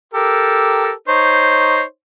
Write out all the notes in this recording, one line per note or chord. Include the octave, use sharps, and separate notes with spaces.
G4 A4 A#4
D#4 C5 C#5